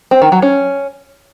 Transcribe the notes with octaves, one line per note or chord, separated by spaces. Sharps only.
C4
D#3
F#3
C#4